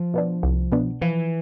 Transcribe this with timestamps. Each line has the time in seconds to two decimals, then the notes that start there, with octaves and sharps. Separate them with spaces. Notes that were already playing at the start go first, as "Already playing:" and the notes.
Already playing: F3
0.14 B2 B3 D4
0.43 C2
0.72 B2 B3 D4
1.01 E3 F3